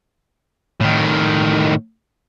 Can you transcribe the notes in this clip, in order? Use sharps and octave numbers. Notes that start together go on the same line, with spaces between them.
A2 D#3